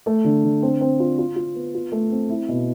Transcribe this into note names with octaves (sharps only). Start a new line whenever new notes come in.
A3
D3
D3
C4
C4
F4
F4
F4
B3
F4
A3
C4
E4
B2